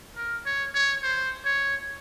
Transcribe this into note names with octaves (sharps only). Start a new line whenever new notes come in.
A#4
C#5
C#5
C5
C#5